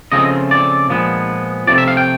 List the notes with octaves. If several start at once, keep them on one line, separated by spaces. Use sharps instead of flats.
C#3 F3 A3 C4 F4 D#5
D5
A#2 F3 G#3 B3
C3 F3 A3 D5
E5
F5
G5